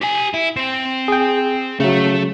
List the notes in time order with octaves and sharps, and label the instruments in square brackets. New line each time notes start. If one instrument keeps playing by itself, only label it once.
[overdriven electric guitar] G4 G#5
E4
C4
[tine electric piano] G#4 G5
[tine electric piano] C#3 F#3 [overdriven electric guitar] A3